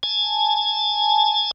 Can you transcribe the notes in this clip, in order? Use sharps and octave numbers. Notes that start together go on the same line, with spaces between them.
G#5 A5